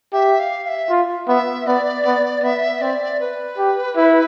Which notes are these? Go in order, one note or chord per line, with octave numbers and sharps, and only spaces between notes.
G4 E5
F5
F5
E5
F4
B3 E5
B3 D5
B3
B3 E5
C4 D5
B4
G4
E4